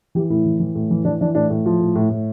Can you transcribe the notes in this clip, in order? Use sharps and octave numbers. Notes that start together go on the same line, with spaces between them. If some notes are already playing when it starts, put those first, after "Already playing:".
E3 G4
A2 E4
E3
E3
A2
E3
E3 D4
E3 D4
A2 D4
A2
F3
A2
A2
A2